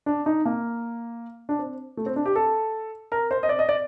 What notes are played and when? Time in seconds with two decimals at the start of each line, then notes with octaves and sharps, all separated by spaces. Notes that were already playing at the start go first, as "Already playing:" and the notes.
0.06 D4
0.26 D#4
0.46 A#3
1.49 D4
1.59 C4
1.97 A3
2.06 C4
2.16 D4
2.26 G4
2.36 A4
3.12 A#4
3.31 C5
3.43 D#5
3.49 D5
3.59 D#5
3.69 D5